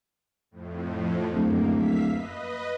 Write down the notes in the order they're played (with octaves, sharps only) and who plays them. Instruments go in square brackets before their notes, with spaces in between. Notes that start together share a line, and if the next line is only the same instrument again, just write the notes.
[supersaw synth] F2 A2
[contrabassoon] D1 [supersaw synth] F#2 A#3
[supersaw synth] E5 F5 B6
B4 D#5